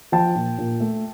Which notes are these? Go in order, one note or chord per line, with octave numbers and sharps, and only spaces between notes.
F3 G5 A5
A#2
A#2
A3